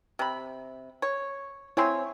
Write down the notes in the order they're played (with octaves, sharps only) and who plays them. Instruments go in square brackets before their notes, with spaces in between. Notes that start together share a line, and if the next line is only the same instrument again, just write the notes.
[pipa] C3 B5
C#5
[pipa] C4 C#5 [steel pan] E4 G#5 C6